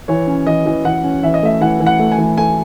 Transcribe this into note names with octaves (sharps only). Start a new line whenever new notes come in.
E3 C#5
C#4
E3 D#5
E3
E3 F#5
C#4
E3 E5
D#5
A3 E5
E3 F#5
E3
F#5
A3
G#5
E3
A3 G#5